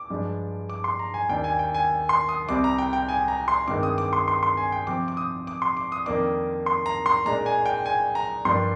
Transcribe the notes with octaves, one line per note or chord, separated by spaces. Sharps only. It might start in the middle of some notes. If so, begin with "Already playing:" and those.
Already playing: D6
G2 F3 G#3 D4
D6
C6
A#5
G#5
D#2 D#3 A#3 D4 G5
G#5
G5
G#5
C6
D#6
C2 C3 G3 C4 D6
A#5
G5
G5
G#5
A#5
C6
G2 D#3 G#3 C4 D6
D#6
D6
C6
C6
C6
G#5
G5
C3 F3 C4 D6
D6
D#6
D6
C6
D6
D#6
F2 D#3 A#3 D4 D6
C6
A#5
C6
A#2 G#3 D4 A#5
G#5
G5
G#5
A#5
G2 F3 A#3 D4 C6